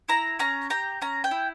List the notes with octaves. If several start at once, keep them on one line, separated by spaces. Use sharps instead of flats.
E4 A#5
C#4 A#5
G4 A#5
C#4 A#5
G5
E4